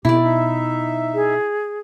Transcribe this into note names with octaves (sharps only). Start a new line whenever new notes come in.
F2 B2 E4 G4 D5
D#4 E5
G#4